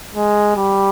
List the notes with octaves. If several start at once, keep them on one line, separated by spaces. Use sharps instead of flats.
G#3
G3